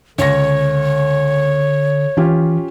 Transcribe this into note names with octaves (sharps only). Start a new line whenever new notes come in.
C#2 D3 C#5 A#6
E3 C#4 F4 G4